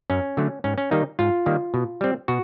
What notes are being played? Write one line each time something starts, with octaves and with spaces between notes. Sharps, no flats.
F#2 C#4
D3 F#3 A3
G#2 C#4
C#4
D#3 G3 A#3 D#4
G#2 F4
D#3 G3 A#3
B2
G3 C4
B2 F#4